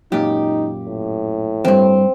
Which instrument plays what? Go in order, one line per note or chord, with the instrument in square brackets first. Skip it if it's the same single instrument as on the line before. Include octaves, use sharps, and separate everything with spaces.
[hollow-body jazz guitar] F#2 A#2 [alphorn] D#4 [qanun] G4
[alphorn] A2
[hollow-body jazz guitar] E2 G2 [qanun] C4